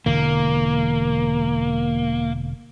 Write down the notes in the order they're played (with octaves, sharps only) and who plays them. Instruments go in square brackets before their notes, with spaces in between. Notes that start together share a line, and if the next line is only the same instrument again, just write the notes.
[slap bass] E1 D3 E3 [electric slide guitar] A#3